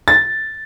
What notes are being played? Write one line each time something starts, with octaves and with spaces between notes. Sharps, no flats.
A6